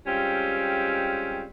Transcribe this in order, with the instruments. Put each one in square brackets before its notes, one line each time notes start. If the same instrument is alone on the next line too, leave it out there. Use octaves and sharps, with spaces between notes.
[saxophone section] G3 G#3 C4 C#4 F4